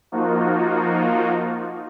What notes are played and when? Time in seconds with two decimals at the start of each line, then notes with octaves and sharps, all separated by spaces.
0.12 F3 A#3 D#4 F4 F#4